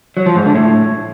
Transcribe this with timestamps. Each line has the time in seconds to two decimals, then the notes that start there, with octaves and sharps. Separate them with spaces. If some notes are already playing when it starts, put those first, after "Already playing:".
0.17 F#3
0.26 F3
0.36 G#2
0.45 D3
0.55 A2